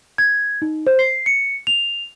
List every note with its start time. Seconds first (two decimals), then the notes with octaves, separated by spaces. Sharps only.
0.18 G#6
0.62 D#4
0.87 C5
0.99 C7
1.26 C#7
1.67 F7